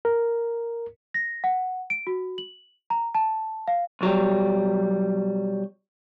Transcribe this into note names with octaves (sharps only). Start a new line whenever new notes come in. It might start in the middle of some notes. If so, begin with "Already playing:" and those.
A#4
A#6
F#5
D7
F#4
F#7
A#5
A5
F5
B1 F#3 G3